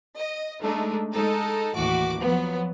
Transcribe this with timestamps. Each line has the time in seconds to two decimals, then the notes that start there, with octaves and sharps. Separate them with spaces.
0.17 D#5
0.61 G#3 A3 D4 D#4
1.13 G#3 D#4 A4
1.74 D#2 A2 E3 F#4 D6
2.21 F3 F#3 B3